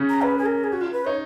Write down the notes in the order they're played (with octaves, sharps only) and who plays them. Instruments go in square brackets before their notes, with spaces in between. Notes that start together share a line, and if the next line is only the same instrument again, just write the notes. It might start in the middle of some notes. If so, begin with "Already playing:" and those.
Already playing: [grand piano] C#3 C#4
[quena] A#5
B4
G#4
A#4
G#4
F#4
F4
B4
[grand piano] D#4 [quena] C#5